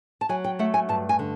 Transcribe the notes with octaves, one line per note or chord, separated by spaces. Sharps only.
A5
F#3 G#5
G5
A3 F#5
G#5
G2 A5
G#5
D3